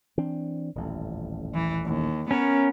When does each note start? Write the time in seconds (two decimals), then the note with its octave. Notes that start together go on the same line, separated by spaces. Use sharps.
0.18 E3 C4 D4
0.75 D#1 A1 F2
1.54 E3
1.86 D#2
2.31 B3 C#4 A#4 C#5